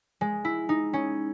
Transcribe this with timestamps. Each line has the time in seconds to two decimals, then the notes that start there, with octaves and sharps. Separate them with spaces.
0.21 G#3
0.45 E4
0.69 D#4
0.93 C#4